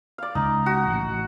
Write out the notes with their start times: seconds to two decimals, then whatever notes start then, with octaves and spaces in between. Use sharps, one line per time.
0.18 D5 F5
0.35 C#2 D#4
0.66 F#4
0.90 A1